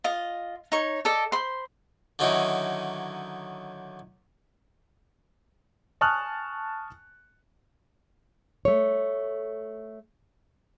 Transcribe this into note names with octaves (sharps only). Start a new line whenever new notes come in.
F4 D#5
D#4 C#5
A4 D5 D#5
C5 B5 C6
D3 D#3 F#3 C#4 D#4 E4
G#5 A5 C#6 D#6 F6 F#6
A3 C#5